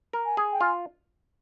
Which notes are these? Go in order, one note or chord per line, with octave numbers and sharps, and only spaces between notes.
A#4
G#5
G#4
G5
F4 G#5